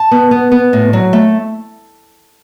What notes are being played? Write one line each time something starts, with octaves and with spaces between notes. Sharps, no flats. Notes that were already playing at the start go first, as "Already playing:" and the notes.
Already playing: A5
B3
B3
B3
A2
F#3
A3